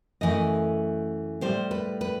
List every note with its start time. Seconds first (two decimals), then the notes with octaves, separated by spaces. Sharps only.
0.21 F#2 E3 A3 D#5
1.41 A2 G3 C5
1.71 B4
2.01 B4